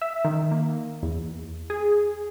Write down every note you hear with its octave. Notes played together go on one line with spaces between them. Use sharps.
E5
D#3
A#3
E2
G#4